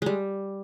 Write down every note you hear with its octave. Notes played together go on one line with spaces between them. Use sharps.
G3 G#3